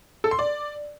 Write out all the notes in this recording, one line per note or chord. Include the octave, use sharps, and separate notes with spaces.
A4
C6
D5